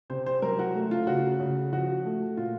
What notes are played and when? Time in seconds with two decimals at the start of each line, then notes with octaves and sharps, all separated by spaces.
0.10 C3 C5
0.26 C5
0.42 F#3 A#4
0.59 F#4
0.74 A3
0.91 F4
1.07 C#3 F#4
1.40 C#3
1.73 F3 F#4
2.05 A3
2.37 A#2 F4